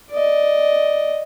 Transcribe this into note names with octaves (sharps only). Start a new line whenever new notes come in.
D5 D#5